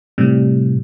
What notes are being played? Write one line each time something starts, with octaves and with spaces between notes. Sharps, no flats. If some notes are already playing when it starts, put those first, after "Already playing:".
A2 C3 G3